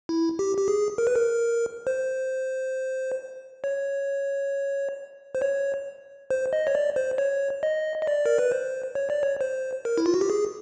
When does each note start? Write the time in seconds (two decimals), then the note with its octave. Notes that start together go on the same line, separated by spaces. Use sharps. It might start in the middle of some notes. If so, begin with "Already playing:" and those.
0.09 E4
0.39 G4
0.57 G4
0.68 G#4
0.98 A#4
1.07 B4
1.16 A#4
1.87 C5
3.64 C#5
5.35 C5
5.42 C#5
6.30 C5
6.53 D#5
6.67 C#5
6.75 D5
6.96 C5
7.18 C#5
7.63 D#5
8.02 D#5
8.07 D5
8.26 A#4
8.38 B4
8.51 C5
8.95 C#5
9.10 D5
9.23 C#5
9.41 C5
9.85 A#4
9.98 E4
10.06 F4
10.14 F#4
10.21 G4
10.30 G#4